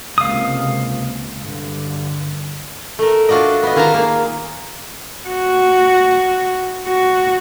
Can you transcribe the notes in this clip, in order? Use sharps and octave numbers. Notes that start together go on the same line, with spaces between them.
C#2 C3 A#3 F5 D#6
G2 D3
A3 A#4
D4 F4 F#4 D5 D#5
B3 D#5
D#3 F4 G#4 F5 A5 A#5
A#3
F#4
F#4